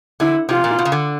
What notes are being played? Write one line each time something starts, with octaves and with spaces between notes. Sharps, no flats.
D3 E4
C3 F4
A#2
B2
C#3
D3